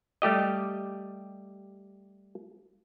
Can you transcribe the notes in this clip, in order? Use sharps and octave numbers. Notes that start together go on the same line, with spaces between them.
G3 A3 G4 D#5